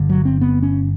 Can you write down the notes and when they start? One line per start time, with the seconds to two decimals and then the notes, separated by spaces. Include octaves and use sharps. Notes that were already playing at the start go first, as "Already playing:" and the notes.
Already playing: G1 G2 D3
0.09 F#3
0.25 C4
0.41 B3
0.63 C#4